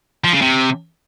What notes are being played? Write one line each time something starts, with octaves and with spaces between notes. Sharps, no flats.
F3
C#3
C3